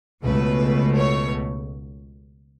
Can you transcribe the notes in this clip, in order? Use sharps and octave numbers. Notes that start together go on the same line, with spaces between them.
C#2 B2 A3 B4
C#5